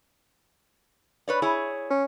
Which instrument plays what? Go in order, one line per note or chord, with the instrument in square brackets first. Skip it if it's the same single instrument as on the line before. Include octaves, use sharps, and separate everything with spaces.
[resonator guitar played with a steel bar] B4 C#5 D5
E4 G#4 C#5
[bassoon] C#4